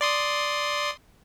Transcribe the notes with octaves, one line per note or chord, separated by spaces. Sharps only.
D5 C6 D#6